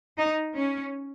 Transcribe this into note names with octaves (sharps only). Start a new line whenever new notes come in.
D#4
C#4